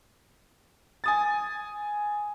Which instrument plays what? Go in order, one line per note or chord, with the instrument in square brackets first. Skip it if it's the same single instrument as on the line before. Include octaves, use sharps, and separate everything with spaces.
[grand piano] G#5 D#6 A6